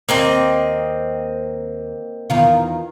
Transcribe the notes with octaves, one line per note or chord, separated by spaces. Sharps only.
D#2 A#3 C4 D#5
E2 D#3 F4